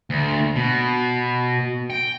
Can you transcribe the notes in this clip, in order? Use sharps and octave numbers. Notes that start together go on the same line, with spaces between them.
D2
B2
G5